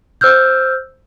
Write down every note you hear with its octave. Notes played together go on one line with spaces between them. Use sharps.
C5 E6 F6 G6